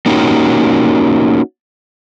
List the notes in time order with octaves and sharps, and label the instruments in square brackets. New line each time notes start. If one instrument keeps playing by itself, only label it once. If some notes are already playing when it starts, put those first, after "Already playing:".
[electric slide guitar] A#3 C#4 D#4 F#4 G4